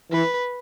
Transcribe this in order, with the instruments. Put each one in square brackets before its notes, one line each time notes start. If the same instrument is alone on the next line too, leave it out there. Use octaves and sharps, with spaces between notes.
[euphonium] E3 [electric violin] B4